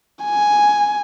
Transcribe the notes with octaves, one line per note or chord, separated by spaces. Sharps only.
G#5